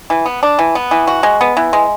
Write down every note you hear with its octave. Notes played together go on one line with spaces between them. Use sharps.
E3
B3
D4
E3
B3
E3
F#4
G#3
B3
E3
G#3